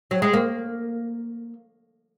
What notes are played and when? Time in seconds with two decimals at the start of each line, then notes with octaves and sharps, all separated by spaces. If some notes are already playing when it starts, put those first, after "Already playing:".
0.11 F#3
0.22 G#3
0.34 A#3